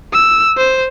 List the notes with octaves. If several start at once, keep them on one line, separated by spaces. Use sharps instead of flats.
E6
C5